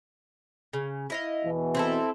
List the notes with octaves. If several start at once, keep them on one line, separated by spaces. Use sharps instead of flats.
C#3
E4 D#5 F5
E2 B2 E3
C4 E4 A4